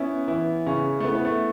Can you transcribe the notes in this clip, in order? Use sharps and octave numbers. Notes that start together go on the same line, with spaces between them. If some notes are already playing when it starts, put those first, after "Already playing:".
Already playing: B3 C#4 E4
E3 E4
C#3 C#4
A3
B3 E4
B3
A3